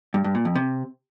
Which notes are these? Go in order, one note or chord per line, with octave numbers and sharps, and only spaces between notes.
G2
G2
A#2
F2
C3